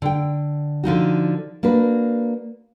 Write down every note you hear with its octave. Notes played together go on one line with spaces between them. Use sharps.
D3 G5
D3 F3 D#4 F#4
A#3 D4 F#4 B4